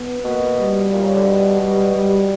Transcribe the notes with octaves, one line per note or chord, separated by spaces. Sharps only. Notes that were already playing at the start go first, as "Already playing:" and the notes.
Already playing: B3
B2 A#3
G3
A#2
C#3
D3
B2
G3
G3